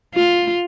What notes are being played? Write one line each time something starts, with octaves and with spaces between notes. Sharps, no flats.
F4